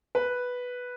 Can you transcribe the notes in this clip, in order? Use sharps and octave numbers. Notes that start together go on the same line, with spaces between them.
B4